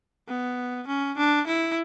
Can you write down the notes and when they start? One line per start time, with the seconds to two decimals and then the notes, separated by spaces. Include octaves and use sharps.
0.28 B3
0.87 C#4
1.18 D4
1.47 E4